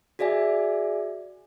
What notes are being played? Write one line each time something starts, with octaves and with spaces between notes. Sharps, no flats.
F#4 G#4 D5 E5 G#5